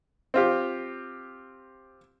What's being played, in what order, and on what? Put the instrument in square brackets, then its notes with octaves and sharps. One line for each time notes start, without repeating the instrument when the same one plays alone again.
[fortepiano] C4 F4 G4